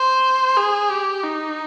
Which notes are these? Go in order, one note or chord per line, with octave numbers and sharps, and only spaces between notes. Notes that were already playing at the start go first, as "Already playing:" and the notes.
Already playing: C5
G#4
G4
D#4